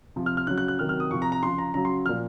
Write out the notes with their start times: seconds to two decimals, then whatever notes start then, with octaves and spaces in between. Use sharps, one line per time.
0.16 C3 F3
0.26 F6
0.37 F6
0.47 C#3 F#3 F#6
0.58 F#6
0.68 F#6
0.79 C3 D#3 F#3 F6
0.89 F6
1.00 D#6
1.11 C3 F3 C#6
1.22 A#5
1.32 A#5
1.43 C#3 F3 C6
1.58 A#5
1.74 C#3 F#3 A#5
1.85 C6
2.06 A#2 F3 F6